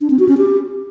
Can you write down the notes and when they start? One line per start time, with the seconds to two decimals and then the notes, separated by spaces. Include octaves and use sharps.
0.01 D4
0.10 C4
0.19 F#4
0.29 C#4
0.38 G4